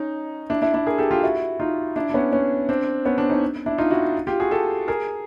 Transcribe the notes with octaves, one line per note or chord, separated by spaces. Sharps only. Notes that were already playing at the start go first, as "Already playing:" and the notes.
Already playing: C#4 D#4
D4 E4
D4 E4
D4 E4
G#4 A#4
G4 A4
F4 G4
E4 F#4
D#4 F4
D4 E4
D4
B3 C#4
B3 C#4
C4 D4
B3 C#4
C4 D4
C#4 D#4
D4 E4
D#4 F4
E4 F#4
F4 G4
F#4 G#4
G4 A4
G#4 A#4